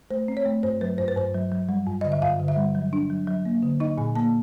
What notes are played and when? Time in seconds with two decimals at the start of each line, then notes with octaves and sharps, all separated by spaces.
0.11 A3 C5
0.28 C4
0.37 C#5
0.45 A3
0.63 G2 C5
0.81 F#3 B4
0.98 G2 C5
1.08 B4
1.16 G2 C5
1.34 F#3
1.52 F#3
1.69 G3
1.87 G2
2.01 D3 D#5
2.12 E5
2.22 G2 F5
2.40 D3
2.48 E5
2.57 G3
2.75 F#3
2.93 D4
3.10 F#3
3.27 F#3
3.45 A#3
3.63 D3
3.80 D#4 D#5
3.98 A#2 G#5
4.16 A#3 A5